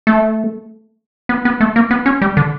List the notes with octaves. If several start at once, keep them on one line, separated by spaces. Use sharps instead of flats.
A3
B3
B3
A3
A#3
B3
C#4
G3
D3